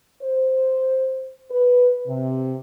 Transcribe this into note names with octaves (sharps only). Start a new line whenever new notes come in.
C5
B4
C3